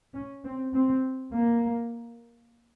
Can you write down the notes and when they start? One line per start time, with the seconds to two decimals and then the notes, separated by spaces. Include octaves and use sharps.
0.14 C#4
0.44 C4
0.73 C4
1.33 A#3